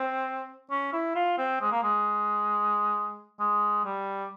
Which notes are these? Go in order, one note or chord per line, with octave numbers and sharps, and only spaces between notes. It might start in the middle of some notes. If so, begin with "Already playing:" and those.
Already playing: C4
C#4
E4
F4
C4
G#3
A#3
G#3
G#3
G3